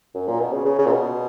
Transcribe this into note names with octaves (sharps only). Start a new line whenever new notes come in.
F#2
A#2
B2
C#3
C#3
C#3
A#2
B2